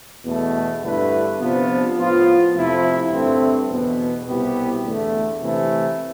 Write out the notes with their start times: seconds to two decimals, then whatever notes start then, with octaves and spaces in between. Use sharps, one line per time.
0.24 E2 B2 A3
0.82 G2 D3 A3 E4 B4
1.39 C3 F3 B3 D4 F4
1.97 A2 F3 B3 F4
2.54 F2 C3 F3 A3 E4
3.11 G2 D3 A3 C4
3.69 E2 B2 B3
4.26 C2 B2 B3 E4 G4
4.83 E2 D3 A3
5.41 C3 E3 A3